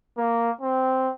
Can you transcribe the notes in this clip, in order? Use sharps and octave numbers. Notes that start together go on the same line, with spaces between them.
A#3
C4